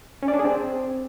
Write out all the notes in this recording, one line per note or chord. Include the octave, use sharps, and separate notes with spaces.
C#4
D5
D4
G#4
C4